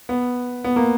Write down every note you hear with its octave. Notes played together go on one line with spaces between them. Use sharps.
B3
B3
A#3